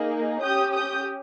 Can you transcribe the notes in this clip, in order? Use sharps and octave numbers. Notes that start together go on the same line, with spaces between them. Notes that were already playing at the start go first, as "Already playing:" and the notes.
Already playing: A#3 D#4 G#4
C#4 G4 D#6 G6
D#6 G6